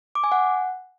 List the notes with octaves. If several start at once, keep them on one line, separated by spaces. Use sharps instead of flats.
D6
G#5
F#5